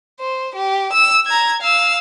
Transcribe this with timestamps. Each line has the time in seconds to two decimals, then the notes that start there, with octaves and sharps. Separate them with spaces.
0.20 C5
0.55 G4
0.93 E6
1.26 A#5 G#6
1.62 F5 E6